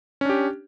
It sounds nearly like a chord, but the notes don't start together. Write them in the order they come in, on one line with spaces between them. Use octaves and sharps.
C#4 D4 G4